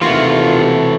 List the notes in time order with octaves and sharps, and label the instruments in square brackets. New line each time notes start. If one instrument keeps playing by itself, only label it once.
[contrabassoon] D#2 [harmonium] C3 A3 [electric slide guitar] E3 F#4 [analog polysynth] F4